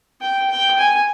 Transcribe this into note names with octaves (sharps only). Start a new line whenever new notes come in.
G5
G5
G#5